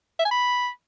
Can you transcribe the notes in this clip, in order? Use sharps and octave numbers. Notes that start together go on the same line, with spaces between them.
E5
G#5
B5